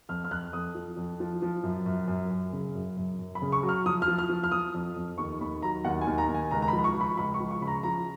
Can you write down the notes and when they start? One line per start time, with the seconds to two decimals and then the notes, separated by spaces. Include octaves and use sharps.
0.09 F2 F6
0.24 F6
0.31 F2 F#6
0.53 F2 D#6
0.75 F3
0.97 F2
1.20 F3
1.42 F3
1.63 F#2
1.86 F#2
2.08 F#2
2.30 F#2
2.53 C#3
2.75 F#2
2.97 F#2
3.19 F#2
3.35 B5
3.42 C#3
3.52 C#6
3.63 F#3
3.69 F6
3.86 F3 D#6
4.02 F6
4.08 F3
4.19 F6
4.29 F3
4.43 F6
4.52 F3 D#6
4.74 F2
4.96 F2
5.18 D#2 C#6
5.41 D#2 B5
5.62 F#3 A#5
5.85 D#2 F#5
6.01 G#5
6.07 D#2
6.18 A#5
6.29 D#2
6.35 G#5
6.51 C#2 A#5
6.62 A#5
6.68 B5
6.73 F3
6.79 B5
6.84 C#6
6.95 F3
7.01 B5
7.17 C#2 B5
7.34 C#6
7.40 F3
7.51 C#6
7.61 C#3 B5
7.67 A#5
7.83 F3 A#5